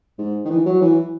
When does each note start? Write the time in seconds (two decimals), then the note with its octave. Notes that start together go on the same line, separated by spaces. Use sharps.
0.19 G#2
0.45 D#3
0.50 E3
0.66 F#3
0.82 E3